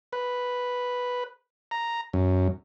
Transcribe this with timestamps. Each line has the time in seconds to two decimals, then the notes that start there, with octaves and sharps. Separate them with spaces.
0.13 B4
1.71 A#5
2.13 F#2